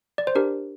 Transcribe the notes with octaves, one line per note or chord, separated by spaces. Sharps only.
D5
C5
D4 G4 A#4